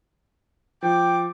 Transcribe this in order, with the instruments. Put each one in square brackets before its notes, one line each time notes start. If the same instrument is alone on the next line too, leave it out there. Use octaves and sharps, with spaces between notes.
[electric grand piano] F3 [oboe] G5 [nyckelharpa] D6